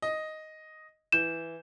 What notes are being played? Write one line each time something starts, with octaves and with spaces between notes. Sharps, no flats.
D#5
E3 G6 E7